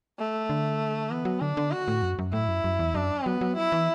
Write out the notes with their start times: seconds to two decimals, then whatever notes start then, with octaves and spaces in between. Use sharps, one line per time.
0.18 A3
0.50 D3
1.10 E3 B3
1.25 F#3
1.41 D3 D4
1.57 D3
1.71 F#4
1.88 A2
2.03 F#2
2.19 F#2
2.33 A2 E4
2.48 F#2
2.64 F#2
2.79 E2
2.95 F#2 D4
3.26 F#3 B3
3.41 F#3
3.56 E4
3.72 E3